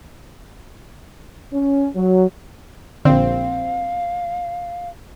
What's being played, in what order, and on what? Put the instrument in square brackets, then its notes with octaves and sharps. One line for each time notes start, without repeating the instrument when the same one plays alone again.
[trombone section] C#4
F#3
[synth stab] A#1 C4 [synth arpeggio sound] D3 [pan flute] F5